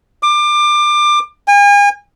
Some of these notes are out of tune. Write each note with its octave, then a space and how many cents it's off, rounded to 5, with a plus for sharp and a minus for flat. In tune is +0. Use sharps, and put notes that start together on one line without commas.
D6 +25
G#5 -40